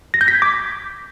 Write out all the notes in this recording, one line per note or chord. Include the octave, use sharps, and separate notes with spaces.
A#6
G6
B6
G#6
D6